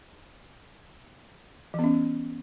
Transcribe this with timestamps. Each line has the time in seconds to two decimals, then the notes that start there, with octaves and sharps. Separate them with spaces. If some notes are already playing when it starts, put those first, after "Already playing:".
1.74 E3
1.79 B3
1.84 C#4